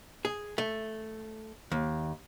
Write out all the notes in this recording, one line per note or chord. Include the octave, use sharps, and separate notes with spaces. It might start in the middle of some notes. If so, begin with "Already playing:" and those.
G#4
A3
D#2